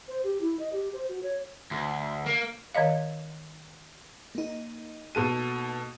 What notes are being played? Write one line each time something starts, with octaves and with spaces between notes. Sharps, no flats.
C5
G4
E4
D#5
G4
C5
F#4
C#5
D2
A#3
D#3 C#5 D#5 F5
A#3 D#4
B2 A4 D#7